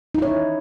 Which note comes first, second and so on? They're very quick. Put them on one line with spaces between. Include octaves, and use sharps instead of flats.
D#4 E4 C#5